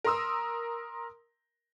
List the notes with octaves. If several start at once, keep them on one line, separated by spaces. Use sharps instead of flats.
A#4 A#5 C6 D#6 E6